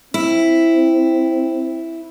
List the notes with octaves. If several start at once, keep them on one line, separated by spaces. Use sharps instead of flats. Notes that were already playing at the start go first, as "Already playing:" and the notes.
C4 E4